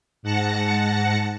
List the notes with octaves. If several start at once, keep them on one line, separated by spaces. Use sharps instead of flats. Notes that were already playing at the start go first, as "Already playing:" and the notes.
G#2 F#5 A5 A#6 C#7